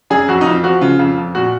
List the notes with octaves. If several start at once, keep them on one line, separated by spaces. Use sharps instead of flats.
F#2 G#4
F2 F#4
D#4
F2 F4
F3 F#4
C#3 F4
F2 F4
F2
A#2 F#4